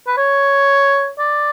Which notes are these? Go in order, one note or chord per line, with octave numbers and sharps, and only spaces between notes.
B4
C#5
D5